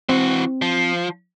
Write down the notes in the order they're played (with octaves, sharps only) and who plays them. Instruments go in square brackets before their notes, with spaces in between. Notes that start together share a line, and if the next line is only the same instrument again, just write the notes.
[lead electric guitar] E3 F#4 [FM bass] C4
[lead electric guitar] F3